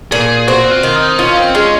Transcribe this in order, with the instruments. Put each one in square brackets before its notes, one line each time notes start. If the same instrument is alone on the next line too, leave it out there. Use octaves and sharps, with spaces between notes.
[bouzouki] A#2 [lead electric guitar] G#4
[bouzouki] C4 [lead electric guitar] F#4
[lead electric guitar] F4
[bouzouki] D#3
[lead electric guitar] D#4
[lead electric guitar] C#4 [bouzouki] F4
[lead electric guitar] C4
[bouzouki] G#3 [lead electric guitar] C#4